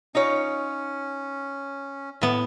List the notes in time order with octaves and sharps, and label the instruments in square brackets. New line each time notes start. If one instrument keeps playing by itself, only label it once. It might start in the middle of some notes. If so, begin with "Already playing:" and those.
[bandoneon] C#4 [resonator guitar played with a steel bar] D#4 F4 C#5
[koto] A2 B3